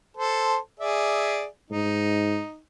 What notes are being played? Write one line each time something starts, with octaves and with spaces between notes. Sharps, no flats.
A4 C5
G#4 D5 E5
G#2 D#4